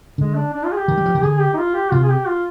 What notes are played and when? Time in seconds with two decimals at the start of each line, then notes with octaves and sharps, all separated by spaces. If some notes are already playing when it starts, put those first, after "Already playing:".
0.18 D3 G#3
0.35 D4
0.53 D4
0.65 F4
0.72 G#4
0.77 G4
0.88 D#3
0.97 G3
1.06 F3
1.15 D#3
1.23 D3 G#4
1.40 G4
1.54 D#4
1.58 F4
1.75 G4
1.92 C3 F4
2.03 G#4
2.09 G4
2.27 F4